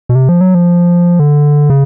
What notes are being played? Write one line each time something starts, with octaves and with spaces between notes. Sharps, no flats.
B2
C3
F3
F#3
F3
D3
C#3